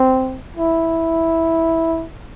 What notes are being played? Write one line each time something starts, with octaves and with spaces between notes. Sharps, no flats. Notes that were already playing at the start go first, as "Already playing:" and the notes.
Already playing: C4
E4